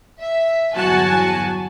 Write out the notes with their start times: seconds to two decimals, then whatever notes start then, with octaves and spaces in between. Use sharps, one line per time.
0.20 E5
0.76 G1 E2 F#3 F#4 G#5 A5